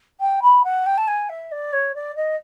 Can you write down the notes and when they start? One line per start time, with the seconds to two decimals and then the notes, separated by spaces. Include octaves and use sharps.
0.20 G5
0.42 B5
0.64 F#5
0.86 G5
0.97 A5
1.07 G#5
1.29 E5
1.51 D5
1.73 C#5
1.95 D5
2.16 D#5